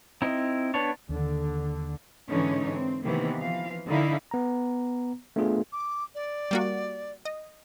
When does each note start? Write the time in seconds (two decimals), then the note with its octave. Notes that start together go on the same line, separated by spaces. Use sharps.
0.22 C4 D#4 E4
0.74 B3 D4 C#5
1.09 D#2 D3
2.29 G#2 D3 E3 C#4 D#4 C#5
2.74 C4
3.04 C3 D#3 E3 A#3 B3
3.40 E3 F3 F5
3.87 D3 D#3 D#4 E4 F5
4.31 B3 A#5
5.36 A3 B3 D4 F4 G#4
5.72 D6
6.15 D5
6.51 G3 A#3 F#4
7.25 D#5